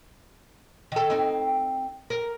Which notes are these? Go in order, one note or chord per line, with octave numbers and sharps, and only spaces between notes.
D#3 A4
C4 D#4
A#4